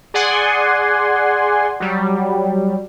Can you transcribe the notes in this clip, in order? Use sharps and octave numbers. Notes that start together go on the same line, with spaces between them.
G#4 D5 F#5 G#5 C6
F#3 G3